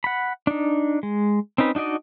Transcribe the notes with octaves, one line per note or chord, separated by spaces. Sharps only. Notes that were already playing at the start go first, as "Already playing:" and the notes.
F#5 B5
D4 D#4
G#3
C4 C#4 D#4 B4
D4 D#4 F#4 D5 D#5